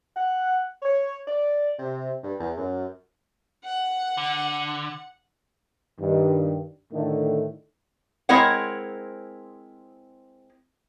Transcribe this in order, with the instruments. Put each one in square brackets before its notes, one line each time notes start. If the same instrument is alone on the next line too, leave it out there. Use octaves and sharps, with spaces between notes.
[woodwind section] F#5
C#5
D5
C3
G2
E2
F#2
[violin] F#5
[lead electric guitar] D3
[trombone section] G2 D#3
A2 D3 D#3 A3
[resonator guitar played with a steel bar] G#3 C4 E4 A#4 C#5 F#5